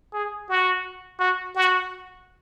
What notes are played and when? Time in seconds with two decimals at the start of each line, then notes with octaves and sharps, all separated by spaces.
0.14 G#4
0.49 F#4
1.20 F#4
1.56 F#4